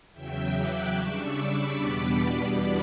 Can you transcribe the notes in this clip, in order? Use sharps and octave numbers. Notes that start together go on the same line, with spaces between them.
E2 C#3 F#3 E5 G5
D6 F#6
C#3 G3 D4 C#6 E6
B5 D6
E2 B2 G3 B3 D4 B5 D6
B5 D6